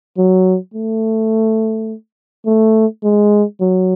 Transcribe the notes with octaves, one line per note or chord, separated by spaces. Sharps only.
F#3
A3
A3
G#3
F#3